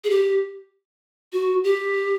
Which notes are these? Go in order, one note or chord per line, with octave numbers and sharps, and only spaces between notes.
G#4
G4
F#4
G4